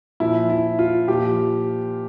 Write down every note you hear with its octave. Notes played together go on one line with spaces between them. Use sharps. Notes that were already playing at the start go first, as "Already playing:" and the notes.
A#2 F3 E4
E4
F4
A#2 F3 G4